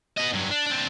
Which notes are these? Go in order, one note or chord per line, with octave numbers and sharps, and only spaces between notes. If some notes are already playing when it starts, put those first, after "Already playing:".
B3 D#5
G2 F#3
D4
C4 D4